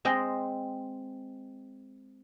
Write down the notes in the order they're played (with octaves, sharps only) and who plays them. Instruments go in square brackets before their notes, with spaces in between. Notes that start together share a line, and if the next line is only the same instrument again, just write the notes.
[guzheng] G#3 C4 D#5 G5